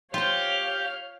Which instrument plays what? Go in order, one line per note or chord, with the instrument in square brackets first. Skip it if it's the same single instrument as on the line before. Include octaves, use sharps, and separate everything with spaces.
[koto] F4 C5 [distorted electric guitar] G4 [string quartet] C#5 F5 F6